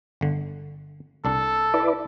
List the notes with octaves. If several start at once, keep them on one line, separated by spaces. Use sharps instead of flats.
G1 D3
C2 D4 A4
E4 B4 D5